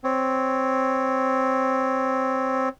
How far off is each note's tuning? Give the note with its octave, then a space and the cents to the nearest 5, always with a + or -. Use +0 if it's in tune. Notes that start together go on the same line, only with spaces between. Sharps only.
C4 +0 C#5 +0